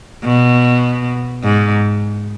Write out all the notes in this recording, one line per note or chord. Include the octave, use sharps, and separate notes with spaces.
B2
G#2